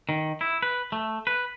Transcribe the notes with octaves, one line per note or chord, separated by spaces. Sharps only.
D#3
E4
B4
A3
B4